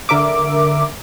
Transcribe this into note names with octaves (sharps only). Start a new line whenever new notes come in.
D3 A#4 E5 D6